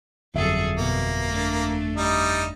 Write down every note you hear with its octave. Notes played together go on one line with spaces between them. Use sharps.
G1 F2 F#3 G#4 A4 E5
B2 A#3
A3 D4
G3 D#4